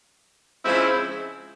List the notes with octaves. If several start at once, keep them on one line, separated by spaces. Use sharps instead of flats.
C#3 F3 G#3 C4 E4